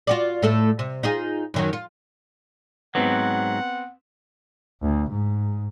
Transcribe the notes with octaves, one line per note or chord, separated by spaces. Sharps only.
F4 F#4 D5
A2 A3 A4
C3
D#4 F4 G#4
F#2 D#3 F#3
F4
G#2 F#3 B3 C4 B4 F#5
D2
G#2